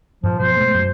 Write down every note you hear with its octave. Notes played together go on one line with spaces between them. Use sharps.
G2 A#2 F3
B2 F3 C5
B2 G#3 A3
F#2 F#3